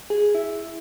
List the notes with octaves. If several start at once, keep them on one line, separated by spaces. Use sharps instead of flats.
G#4
E4